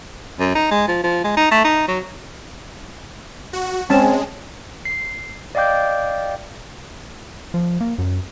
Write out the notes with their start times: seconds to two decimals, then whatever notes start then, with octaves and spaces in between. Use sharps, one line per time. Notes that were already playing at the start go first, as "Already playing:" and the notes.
0.40 F#2
0.56 D#4
0.72 G#3
0.88 F3
1.04 F3
1.24 G#3
1.37 D#4
1.52 A3
1.65 D#4
1.88 F#3
3.53 F#4
3.90 G#3 C4 C#4 A5
4.85 C7
5.55 D5 D#5 F5 G5 D6 G6
7.54 F3
7.81 A#3
7.98 F#2